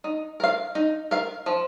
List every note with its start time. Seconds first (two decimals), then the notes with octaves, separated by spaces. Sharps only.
0.04 D#4
0.40 A#4 F5
0.75 D#4
1.11 A#4 F5
1.46 F3